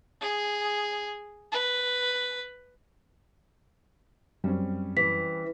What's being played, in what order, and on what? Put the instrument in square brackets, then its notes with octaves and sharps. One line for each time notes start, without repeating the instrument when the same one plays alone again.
[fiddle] G#4
B4
[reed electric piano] F#2 [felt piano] G3 C4 C#4
[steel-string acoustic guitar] E3 [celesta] B6